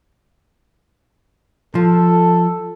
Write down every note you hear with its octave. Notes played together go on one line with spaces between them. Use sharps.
F3 A4